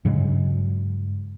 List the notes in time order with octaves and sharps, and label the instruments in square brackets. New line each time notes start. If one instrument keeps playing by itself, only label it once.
[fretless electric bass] G2 C#3 F#3 G#3